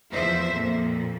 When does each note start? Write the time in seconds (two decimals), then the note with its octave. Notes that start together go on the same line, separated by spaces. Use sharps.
0.11 E2 F3 C5 E5
0.51 F2 A#2